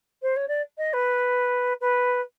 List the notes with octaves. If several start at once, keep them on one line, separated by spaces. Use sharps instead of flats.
C5
C#5
D5
D#5
B4
B4